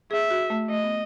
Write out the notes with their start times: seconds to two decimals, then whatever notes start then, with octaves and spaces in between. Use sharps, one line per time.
0.11 G#4 E5
0.31 F#4
0.50 A3
0.70 A3 D#5
0.84 B3